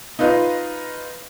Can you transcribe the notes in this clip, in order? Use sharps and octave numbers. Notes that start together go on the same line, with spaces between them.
D#4 F4 B4 D#5